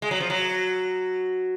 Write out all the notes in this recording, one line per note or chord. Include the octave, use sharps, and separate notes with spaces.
G#3
F#3
F3
F#3